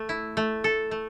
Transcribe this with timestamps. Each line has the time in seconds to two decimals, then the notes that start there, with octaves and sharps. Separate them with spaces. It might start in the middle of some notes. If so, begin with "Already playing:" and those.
Already playing: A3
0.09 E4
0.37 A3
0.64 A4
0.91 A3